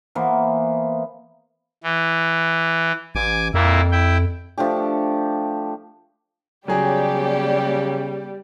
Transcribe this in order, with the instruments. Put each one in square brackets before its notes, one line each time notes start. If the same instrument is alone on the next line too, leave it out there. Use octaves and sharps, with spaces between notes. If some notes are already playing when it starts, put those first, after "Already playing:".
[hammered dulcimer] E3 A#3 B3 C5
[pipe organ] E3
[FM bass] A1 [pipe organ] G#5 D6
[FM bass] F2 [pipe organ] A#2 A#3 E4
[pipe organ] E4 G5
[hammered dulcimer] F3 A3 D4 G4
[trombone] C#3 [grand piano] F#3 G#4 [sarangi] G3 [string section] B3 G4 D5